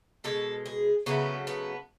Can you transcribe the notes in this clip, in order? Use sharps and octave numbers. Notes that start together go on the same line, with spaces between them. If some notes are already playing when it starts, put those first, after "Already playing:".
B2 G#3 A4
G#4
C#3 F#3 A3 B3
B3